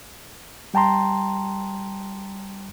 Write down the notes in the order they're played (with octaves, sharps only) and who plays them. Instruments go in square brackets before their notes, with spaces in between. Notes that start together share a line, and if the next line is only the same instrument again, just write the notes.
[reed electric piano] G3 G5 A5 A#5 C6